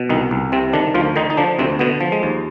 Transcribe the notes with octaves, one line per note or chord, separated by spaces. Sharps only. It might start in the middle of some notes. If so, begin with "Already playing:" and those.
Already playing: B2
C2 D#3 D#4
C2
C3 C4
D3 D#3 D4
D2 F3 F4
D3 D#3 D#4
D#4
D3 F3 D4
D2 C3 C4
B2 D3 B3
F3
G#3
D#2